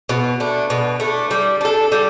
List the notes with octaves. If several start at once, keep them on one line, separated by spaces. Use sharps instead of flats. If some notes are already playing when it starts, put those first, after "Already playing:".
B2
A3 D4
B2
A3 D4
G3
D4 A4
G3